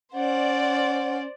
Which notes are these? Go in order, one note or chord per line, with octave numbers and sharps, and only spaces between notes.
C#4 C5 D5 F#5